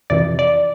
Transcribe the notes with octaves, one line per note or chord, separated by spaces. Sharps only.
F2 C3 E3 D5
D5